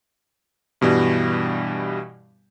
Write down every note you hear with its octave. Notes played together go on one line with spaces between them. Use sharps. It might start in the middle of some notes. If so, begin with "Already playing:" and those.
G2 B2 E3 G3